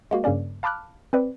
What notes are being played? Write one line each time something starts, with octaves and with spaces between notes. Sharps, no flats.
G#3 A#3 F#4
G2 C#3 A#3 C#4 D5
F5 A5 B5 D6 F6 F#6
C4 B4 D5